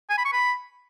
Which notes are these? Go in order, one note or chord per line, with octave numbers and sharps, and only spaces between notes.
G#5
B5
C#6
B5